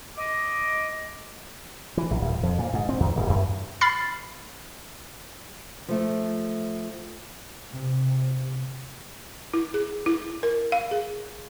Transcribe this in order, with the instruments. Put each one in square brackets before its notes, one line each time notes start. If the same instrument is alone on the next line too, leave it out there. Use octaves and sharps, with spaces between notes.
[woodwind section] D#5 D6
[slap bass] E3
A#1
D#1
F2
A#2
G#2
C4
E2
D#1
F#2
[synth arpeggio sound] B5 F6 A6 C7
[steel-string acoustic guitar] F3 A3
[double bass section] C3
[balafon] E4
G#4
E4
A#4
F5
G#4